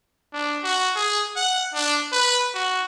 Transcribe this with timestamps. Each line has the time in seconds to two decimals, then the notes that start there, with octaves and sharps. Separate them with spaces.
0.33 D4
0.64 F#4
0.96 G#4
1.36 F#5
1.74 D4
2.13 B4
2.55 F#4